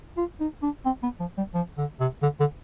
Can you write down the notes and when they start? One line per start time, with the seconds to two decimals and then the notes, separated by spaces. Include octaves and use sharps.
0.17 F4
0.40 D#4
0.62 D4
0.85 C4
1.03 B3
1.20 F3
1.37 G3
1.54 F3
1.78 D3
2.00 C3
2.23 D3
2.40 D3